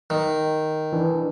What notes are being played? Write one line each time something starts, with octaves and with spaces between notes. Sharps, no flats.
D#3
E3 D4